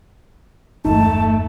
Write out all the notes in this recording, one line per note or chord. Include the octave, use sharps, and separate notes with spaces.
G1 E2 G2 A3 D#4 A5